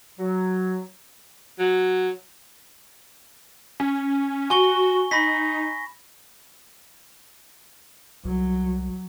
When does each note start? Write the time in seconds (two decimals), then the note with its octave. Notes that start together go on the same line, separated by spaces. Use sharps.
0.19 F#3
1.59 F#3
3.80 C#4
4.50 F#4 G#5 C#6 G7
5.11 D#4 B5 A#6 B6
8.25 C2 F#3